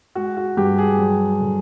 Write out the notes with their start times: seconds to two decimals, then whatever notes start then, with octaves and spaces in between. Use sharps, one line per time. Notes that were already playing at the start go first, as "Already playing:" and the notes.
0.15 G#3 F#4
0.37 F#4
0.57 G2 G4
0.78 G#4
0.98 F#3
1.41 D3